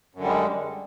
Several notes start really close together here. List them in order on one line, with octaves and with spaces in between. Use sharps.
F#2 D3 G3 G#3